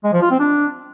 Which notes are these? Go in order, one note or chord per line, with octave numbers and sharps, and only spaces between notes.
G#3
F3
F4
C4
D4